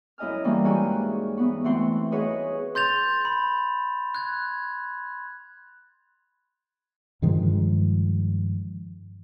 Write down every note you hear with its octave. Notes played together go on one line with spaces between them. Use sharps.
F#2 E4 D#5 G#5 F6
E3 G3 G#3 A#3 C#4
G#2 D#4 F#4 G4 G#5
E3 B3 F#4
E3 A3 C4 F#4 F#5 C6
F#4 G#4 B4 C#5 D#5 F#5
C6 G6 A6 F7
B5
F#6 G#6
G2 D#3 F3 G#3